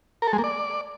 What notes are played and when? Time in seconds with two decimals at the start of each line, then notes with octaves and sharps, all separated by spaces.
0.22 A#4
0.28 A4
0.33 G#3
0.38 A#3
0.44 D5